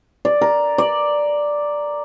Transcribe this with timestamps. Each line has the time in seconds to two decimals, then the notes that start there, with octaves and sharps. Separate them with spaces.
0.25 D5
0.41 A#4
0.78 D5